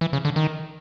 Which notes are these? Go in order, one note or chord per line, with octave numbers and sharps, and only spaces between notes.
E3
C#3
D3
D#3